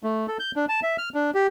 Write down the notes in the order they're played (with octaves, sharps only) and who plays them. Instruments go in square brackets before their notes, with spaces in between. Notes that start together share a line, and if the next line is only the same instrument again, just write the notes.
[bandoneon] A3
A4
G6
D4
A5
E5
F6
D4
G4